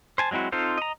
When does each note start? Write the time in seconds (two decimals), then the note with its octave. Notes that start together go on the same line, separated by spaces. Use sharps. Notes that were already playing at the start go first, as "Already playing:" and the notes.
0.18 C5 G#5 A5
0.31 F#3 G#3 C4 E4 F#4
0.52 C4 D#4 F4 A4 C5
0.78 D#5 A#5